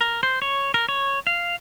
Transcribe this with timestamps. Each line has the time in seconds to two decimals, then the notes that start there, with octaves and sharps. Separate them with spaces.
0.01 A#4
0.23 C5
0.42 C#5
0.74 A#4
0.89 C#5
1.27 F5